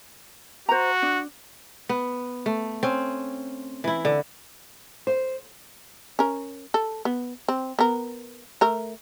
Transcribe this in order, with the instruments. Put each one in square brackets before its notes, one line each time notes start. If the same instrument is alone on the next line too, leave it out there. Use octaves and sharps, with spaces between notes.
[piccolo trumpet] F#4 [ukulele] C5 A#5
[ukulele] D4
[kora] B3
A3
C4 C#4
E3 E4
D3
[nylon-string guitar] C5
[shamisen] C#4 A#4
A4
B3
C4
B3 A#4
A3 A#4